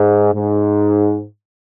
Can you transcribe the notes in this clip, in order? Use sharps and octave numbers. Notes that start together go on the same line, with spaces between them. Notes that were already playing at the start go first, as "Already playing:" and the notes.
Already playing: G#2
G#2